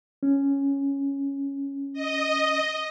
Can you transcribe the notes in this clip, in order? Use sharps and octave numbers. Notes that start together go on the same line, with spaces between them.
C#4
D#5